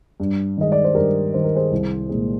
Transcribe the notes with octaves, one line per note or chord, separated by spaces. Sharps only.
G2
D#3 G#3 D#5
D5
C5
G2 G4 A#4
D#3 G#3 C5
A#4
G#4 C5
C2
A#2 G#3